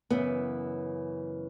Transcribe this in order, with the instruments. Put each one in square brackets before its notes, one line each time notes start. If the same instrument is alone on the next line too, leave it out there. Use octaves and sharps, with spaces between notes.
[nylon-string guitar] F#2 C#3 E3 B3